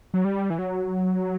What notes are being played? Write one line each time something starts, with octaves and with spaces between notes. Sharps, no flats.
F#3
G3
E3
F#3